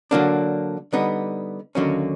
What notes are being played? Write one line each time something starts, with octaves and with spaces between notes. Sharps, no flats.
D3 F#3 A#3 D4
D3 G3 B3 D#4
D#2 D3 F#3 A#3 C#4